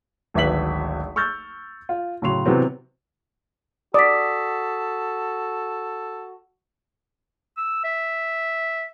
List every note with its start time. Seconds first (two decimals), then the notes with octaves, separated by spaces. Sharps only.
0.34 D1 G#1 B4 E5 B6 F#7
1.16 C#6 E6 F6 G6 A6
1.89 F4
2.22 A2 C#3 F#3 C6 F7
2.46 C3 E3 F#3 B3 C4
3.94 F#4 A4 D5 D#6 B6
7.57 E6
7.84 E5